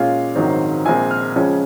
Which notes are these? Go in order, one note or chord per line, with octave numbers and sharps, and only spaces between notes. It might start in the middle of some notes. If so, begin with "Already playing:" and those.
Already playing: A#2 G#3 C#4 F4 F5
A#1 G#2 D#3 F#3 C4
A#1 A#2 G#3 C4 G#5
F6
C#2 C#3 F3 G#3 C#4